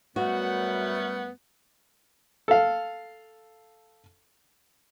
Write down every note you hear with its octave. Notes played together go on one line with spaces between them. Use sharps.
F#2 G3 A3 B3 F#4 F#5
A4 F5